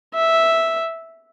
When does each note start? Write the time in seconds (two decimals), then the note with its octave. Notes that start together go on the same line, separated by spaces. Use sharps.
0.14 E5